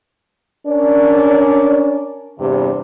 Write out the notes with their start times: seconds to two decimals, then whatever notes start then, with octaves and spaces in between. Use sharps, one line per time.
0.67 C#4 D4 A#4 C#5 D5
2.40 E2 G2 C3